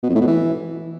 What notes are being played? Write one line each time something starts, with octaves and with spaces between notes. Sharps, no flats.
B2
F2
A2
B2
E3